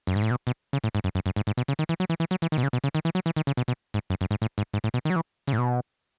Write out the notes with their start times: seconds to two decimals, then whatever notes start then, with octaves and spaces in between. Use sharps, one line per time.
0.07 F#2
0.16 G#2
0.23 A2
0.31 B2
0.47 B2
0.73 C#3
0.84 A2
0.95 G#2
1.04 F#2
1.15 F#2
1.26 F#2
1.36 G#2
1.47 G#2
1.57 B2
1.68 C#3
1.79 D#3
1.89 E3
2.00 F#3
2.10 E3
2.20 E3
2.31 F#3
2.42 E3
2.52 D#3
2.58 B2
2.63 C#3
2.73 B2
2.84 C#3
2.95 D#3
3.05 E3
3.15 F#3
3.26 E3
3.36 D#3
3.47 C#3
3.57 B2
3.68 B2
3.94 G#2
4.10 F#2
4.21 F#2
4.31 G#2
4.42 A2
4.58 G#2
4.74 G#2
4.84 A2
4.94 B2
5.05 D#3
5.10 F#3
5.16 E3
5.47 C#3
5.53 A2
5.58 B2